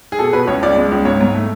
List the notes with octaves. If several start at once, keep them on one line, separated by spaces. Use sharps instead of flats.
G#4
B2 A4
B2 B4
C#2 C#5
C#2 D5
G#3
C#2
G#2 C#5
G#2
A3